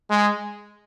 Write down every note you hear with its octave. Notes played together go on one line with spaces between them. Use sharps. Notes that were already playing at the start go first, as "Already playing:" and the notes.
G#3